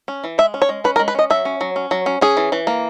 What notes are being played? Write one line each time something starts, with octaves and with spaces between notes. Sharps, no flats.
C#4
E3
G#3 E5
C#4
C#5
G#3
C#4 B4
A#4
G#3
B4
C#4 D#5
F#3 E5
C#4
F#3
C#4
F#3
C#4
C#4 G#4
E3
E3
A#3